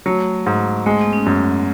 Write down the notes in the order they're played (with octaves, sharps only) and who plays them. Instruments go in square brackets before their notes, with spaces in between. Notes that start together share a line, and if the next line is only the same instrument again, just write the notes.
[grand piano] F#3 [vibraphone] A3
[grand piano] G#2
[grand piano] G#3 [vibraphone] A3
[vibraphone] B3
C#4
[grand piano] F#2